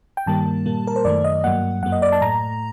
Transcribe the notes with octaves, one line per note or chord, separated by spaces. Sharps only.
G5
G2 D#3 G3 A#3 A5
A#2 G3 A#3
A#4
C5
F#2 D#3 A3 D5
D#5
G2 F#3 A#3 F#5
F#2 F#3 A#3 F#5
D#5
D5
A5
A2 A3 A#5